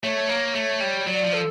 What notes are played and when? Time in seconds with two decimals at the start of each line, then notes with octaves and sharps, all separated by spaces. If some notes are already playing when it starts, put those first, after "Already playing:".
0.03 A3 C#5
0.29 A#3
0.55 A3
0.80 G3
1.06 F#3 D5
1.24 F3
1.33 A4